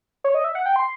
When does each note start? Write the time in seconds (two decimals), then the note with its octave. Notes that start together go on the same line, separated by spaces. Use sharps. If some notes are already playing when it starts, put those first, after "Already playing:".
0.24 C#5
0.35 D#5
0.44 E5
0.55 F#5
0.66 G5
0.76 C6